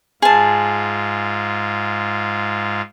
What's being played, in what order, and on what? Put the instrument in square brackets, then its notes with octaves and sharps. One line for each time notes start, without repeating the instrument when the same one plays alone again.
[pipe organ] G#2 F4 [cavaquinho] G#4 A5